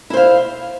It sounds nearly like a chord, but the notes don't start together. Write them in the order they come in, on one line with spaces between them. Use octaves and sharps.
E4 C5 F5